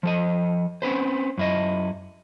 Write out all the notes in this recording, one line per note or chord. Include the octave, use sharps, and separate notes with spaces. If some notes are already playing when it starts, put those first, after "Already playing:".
F3 A4 D#5
C4 C#4 B4 C5
F#2 E4 D#5